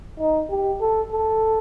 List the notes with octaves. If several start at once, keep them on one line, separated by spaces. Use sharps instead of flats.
D#4
G4
A4
A4